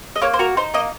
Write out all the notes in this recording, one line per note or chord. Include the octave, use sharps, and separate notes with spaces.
D#5
A#3 C#5
C5
F#4 A#4
D#4 C5
A#3 D#5